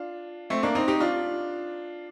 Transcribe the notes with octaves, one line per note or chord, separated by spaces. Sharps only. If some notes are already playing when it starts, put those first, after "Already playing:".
Already playing: D4 F4
A3 C4
A#3 D4
C4 D#4
D#4 G4
D4 F4